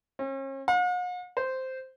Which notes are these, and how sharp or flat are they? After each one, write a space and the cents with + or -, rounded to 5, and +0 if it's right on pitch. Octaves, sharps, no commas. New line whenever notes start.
C#4 -40
F#5 -45
C5 -5